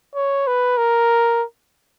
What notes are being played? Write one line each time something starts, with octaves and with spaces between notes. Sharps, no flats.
C#5
B4
A#4